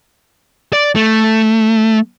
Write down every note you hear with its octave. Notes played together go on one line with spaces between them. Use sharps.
D5
A3